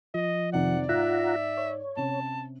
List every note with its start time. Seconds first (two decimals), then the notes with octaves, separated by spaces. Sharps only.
0.14 F3 D#5
0.53 F2 C3 D#3 D5 F#5
0.89 G#2 F4 E5 F#5 A#5
1.57 C#5
1.97 C3 C#4 A5